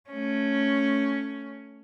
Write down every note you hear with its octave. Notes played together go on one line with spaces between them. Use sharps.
A3 C#4